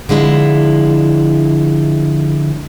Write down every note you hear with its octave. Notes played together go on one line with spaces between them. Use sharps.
D3 F3 G#3 E4